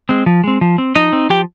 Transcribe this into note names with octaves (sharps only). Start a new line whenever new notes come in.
G#3 C4
F3
G#3 C4
F3
C4
F3 D#4 D#5
C4
F3 G4 G5